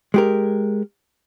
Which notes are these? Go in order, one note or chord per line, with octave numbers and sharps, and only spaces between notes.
G#3 G4 A#4